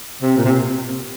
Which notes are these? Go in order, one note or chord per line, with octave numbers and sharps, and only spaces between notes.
C3
A#2
C3